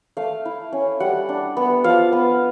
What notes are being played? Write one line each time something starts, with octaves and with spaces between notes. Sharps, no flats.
A3 F5
E4
C#4
G3 F#5
D4
B3
F3 F5
B3